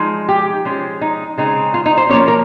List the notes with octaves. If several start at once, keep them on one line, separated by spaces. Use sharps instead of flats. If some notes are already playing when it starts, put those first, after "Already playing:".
Already playing: F3 G#3 D#4
G4
F3 G#3 C#4
D#4
C#3 G#3 C4 D#4
F4
D#4
C5
F3 A#3 C#4 C#5
A#4